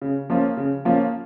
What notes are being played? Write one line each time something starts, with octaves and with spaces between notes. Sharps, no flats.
C#3
F3 A#3 C#4 F4
C#3
F3 A#3 C#4 F4